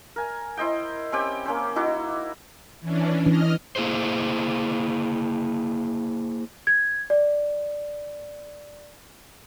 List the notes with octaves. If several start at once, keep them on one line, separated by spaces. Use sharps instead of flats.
A#4 G#5
E4 C5 D#5 G5
C4 C#4 G4 G5
A#3 C#4 C5
D#4 E4 F#4 D6
E3 C#4 D4
E3 D#5 F6
A#3 E4 G#4 C5
G#6
D5